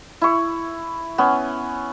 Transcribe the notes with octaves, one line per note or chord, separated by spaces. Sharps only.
E4 C#6
B3 C#4